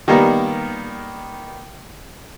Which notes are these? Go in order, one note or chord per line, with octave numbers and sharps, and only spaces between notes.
D#3 G3 A#3 B3 A#4